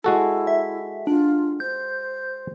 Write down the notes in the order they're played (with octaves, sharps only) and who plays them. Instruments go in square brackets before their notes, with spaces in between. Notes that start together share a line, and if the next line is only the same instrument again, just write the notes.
[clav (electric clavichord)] G#3 F#4 A4 [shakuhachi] E4
[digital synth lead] E5
[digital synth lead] D4 [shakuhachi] F4
[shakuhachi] C5 [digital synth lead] G6